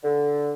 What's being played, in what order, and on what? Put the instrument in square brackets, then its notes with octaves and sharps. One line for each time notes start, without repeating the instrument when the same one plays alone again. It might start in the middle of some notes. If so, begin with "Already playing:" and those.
[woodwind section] D3